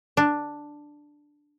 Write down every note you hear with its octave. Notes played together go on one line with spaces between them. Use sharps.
D4